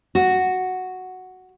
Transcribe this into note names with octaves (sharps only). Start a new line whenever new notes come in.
F#4